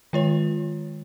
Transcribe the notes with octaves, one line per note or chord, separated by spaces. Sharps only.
D#3 G#3 F4 C#5